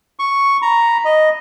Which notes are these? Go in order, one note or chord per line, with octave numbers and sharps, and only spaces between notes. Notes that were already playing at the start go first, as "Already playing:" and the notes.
C#6
A#5 B5
D#5